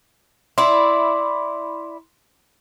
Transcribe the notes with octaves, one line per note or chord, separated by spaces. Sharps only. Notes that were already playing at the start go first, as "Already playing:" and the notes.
E4 D5 C6